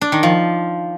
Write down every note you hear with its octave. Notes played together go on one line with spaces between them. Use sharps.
D4
D#3
F3